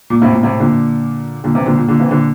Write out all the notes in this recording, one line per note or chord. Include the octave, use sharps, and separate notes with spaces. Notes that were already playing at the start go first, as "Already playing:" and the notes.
A#2
A2 C3
A#2
A2 C3
A#2 D3
A#2 D3
C3 E3
A#2 D3
A#2
A#2 D3
C3 E3
A#2 D3